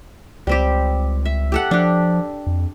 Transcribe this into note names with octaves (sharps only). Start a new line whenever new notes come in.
C#2 G3 C4 G4
E5
G4 A4 F#5
F3 D4 G4
F2